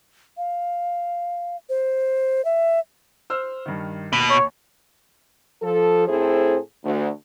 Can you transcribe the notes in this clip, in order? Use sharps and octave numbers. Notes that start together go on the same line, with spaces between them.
F5
C5
E5
C5 E6 F6
G2 D#3
D#2 B2
C#5
F3 A4
A2 C4 E4 G#4 A4 C5
D2